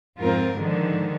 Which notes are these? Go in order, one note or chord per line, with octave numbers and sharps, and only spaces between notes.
F2 G#2 C4 F4 A#4
G#2 D3 D#3 F3